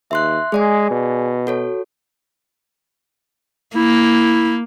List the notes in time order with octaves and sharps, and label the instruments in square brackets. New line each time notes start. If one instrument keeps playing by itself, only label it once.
[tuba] D#2 [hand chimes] E5 C6 F#6
[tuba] G#3 [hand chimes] G#4 D5 G#5
[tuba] B2
[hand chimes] F#4 A4 C#5
[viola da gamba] A#3 [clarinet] E4